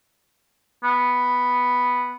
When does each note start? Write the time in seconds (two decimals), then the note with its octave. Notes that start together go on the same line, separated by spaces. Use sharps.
0.84 B3